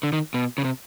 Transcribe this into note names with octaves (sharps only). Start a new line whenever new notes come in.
D3
D#3
B2
C#3
C3